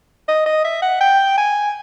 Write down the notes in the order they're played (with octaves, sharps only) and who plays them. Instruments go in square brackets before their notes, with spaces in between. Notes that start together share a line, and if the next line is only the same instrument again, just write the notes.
[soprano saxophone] D#5
D#5
E5
F#5
G5
G#5